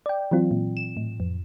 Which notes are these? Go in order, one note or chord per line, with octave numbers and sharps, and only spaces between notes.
D5 G5
E3 F#3 C4 F4
A#2
E7
A2
F2